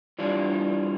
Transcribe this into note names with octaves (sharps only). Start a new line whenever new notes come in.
E3 G3 D4 F4